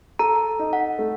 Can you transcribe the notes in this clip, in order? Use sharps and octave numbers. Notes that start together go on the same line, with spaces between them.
A4 A#5
D#4
F#5
A3